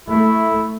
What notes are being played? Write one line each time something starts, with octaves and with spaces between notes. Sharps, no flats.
A3 E4